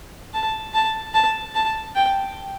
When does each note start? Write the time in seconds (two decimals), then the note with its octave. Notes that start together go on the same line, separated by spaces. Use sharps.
0.34 A5
0.74 A5
1.14 A5
1.55 A5
1.95 G5